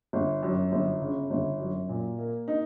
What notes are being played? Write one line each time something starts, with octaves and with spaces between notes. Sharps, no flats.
G1
F#2
G1
C#3
G1
F#2
A#2
A#3
D#4